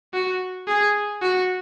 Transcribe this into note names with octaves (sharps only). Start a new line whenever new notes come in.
F#4
G#4
F#4